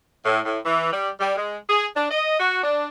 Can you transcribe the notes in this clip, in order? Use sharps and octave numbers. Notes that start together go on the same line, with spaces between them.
A2
A2
E3
G3
G3
G#3
G#4
D4
D#5
F#4
D4